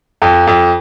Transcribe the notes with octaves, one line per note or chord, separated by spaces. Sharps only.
F2
F2